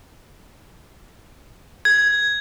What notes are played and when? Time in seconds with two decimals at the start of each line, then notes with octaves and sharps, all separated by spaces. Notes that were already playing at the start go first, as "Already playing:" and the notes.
1.85 G#6